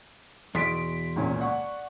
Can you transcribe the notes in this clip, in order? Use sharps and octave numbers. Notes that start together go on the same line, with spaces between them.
E2 B2 C6 B6 D7
C#2 A#2 C#4
D5 F#5 C#6